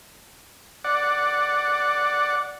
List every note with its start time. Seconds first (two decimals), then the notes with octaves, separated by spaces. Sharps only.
0.84 D5 F#5